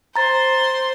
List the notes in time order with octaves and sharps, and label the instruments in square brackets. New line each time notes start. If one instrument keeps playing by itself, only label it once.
[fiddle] C5 C6 [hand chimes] A#5 A6